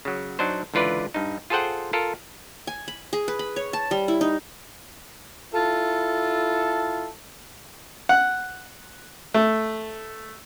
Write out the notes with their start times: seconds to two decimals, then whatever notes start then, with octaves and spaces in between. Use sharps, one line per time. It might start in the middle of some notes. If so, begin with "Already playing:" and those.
0.05 C#3 F#3
0.39 F#3 D4 D#4 C5
0.74 C#2 D3 E3 F4 B4 D5
1.14 G2 D#4
1.50 F4 G#4 A4 C5 F#5 G5
1.93 F4 A4 A#4 F5
2.67 G#5
2.88 B5
3.13 G#4
3.28 B4
3.39 B5
3.56 C#5
3.73 A5
3.91 G3
4.08 E4
4.21 D#4
5.53 E4 F4 A4
8.09 F#5
9.34 A3